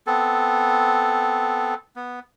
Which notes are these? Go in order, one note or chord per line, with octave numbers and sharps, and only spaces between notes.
B3 C4 A4
B3